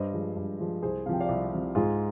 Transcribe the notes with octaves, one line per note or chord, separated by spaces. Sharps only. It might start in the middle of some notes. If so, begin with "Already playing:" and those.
Already playing: G2 C5 D#5
F3 G#3
G2
F3 G#3
C2 G#4 C5
C3 F3 F5 G5
D5 F5
C2
C3 F3
G#2 F4 G#4